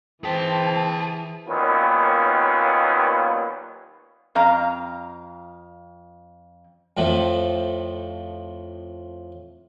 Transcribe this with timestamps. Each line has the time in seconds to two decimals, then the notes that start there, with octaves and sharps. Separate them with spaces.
0.24 E3 C4 G#4 G5 A5
1.48 D#2 A#2 D#3 F#3 B3 C#4
4.35 F2 F5 A#5
6.97 F2 A2 F3 A3